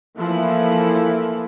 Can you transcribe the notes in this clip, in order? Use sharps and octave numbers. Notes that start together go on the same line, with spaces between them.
E3 F3 A3 A#3 E4